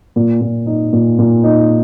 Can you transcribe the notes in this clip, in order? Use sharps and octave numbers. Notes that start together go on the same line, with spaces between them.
A#2
A#2
D#4
A#2
A#2
D#4